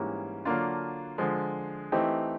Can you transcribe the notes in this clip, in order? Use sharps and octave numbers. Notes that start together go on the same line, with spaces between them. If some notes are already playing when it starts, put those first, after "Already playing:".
Already playing: G#2 E3 G3 A#3 C#4
D3 F#3 A#3 D4 F4
D3 F3 G#3
E3 A3 C4 D#4 G4